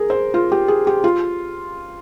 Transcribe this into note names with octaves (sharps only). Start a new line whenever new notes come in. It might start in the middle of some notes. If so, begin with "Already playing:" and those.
Already playing: G#4 A#4
C5
F4
G4
G#4
G4
F4